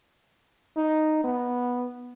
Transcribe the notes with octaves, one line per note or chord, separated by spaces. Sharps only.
D#4
B3